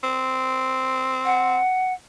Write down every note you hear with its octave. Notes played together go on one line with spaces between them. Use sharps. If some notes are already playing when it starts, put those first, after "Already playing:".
C4
F#5